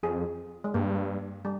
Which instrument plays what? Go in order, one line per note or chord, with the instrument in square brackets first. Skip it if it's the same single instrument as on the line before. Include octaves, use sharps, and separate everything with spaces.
[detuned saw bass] F2 [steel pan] G#4
[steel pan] G#3
[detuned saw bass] G2 [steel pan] A#3
[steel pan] G3